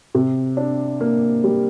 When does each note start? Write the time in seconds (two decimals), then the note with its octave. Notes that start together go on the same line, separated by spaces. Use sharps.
0.15 C3
0.57 D4
1.01 A#3
1.44 G3